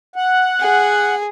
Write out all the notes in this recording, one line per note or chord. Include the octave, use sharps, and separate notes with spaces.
F#5
G#4